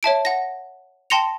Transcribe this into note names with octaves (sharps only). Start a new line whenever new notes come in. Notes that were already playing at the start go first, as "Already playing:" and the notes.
C#5 E5 A5 D7
F#5 A#6
G5 A5 C6 A#6 C#7 F7